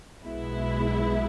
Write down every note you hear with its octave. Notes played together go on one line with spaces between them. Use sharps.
B1 B2 G#3 B3 E4